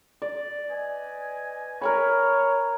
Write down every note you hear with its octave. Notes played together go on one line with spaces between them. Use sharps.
D5
B4 D#5 G#5
A#4 C#5 G#5 B5